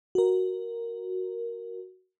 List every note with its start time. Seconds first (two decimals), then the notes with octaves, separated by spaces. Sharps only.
0.15 F#4 A#4